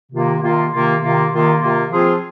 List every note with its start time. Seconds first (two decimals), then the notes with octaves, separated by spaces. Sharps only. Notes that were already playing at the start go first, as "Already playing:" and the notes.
0.12 C3 D#3 A#3 F4
0.42 C3 D#3 A#3 F4
0.72 C3 D#3 A#3 F4
1.02 C3 D#3 A#3 F4
1.31 C3 D#3 A#3 F4
1.61 C3 D#3 A#3 F4
1.90 F3 C4 F4 G#4